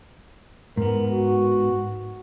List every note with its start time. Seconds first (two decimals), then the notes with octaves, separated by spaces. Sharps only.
0.77 G#2 B3 A#4
1.11 F#4